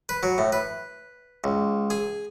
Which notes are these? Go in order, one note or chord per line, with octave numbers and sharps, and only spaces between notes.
B4
F#3
A2
B4
C#2
G#4